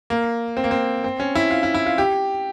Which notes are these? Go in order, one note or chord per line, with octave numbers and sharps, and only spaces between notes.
A#3
C4
A#3
C4
C4
C#4
E4
F4
E4
E4
F4
G4